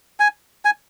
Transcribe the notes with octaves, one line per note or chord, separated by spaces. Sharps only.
G#5
G#5